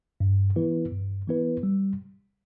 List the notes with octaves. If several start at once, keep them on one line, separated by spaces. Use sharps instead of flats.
G2
E3 B3 E4 B4
G2
E3 B3 E4 B4
G3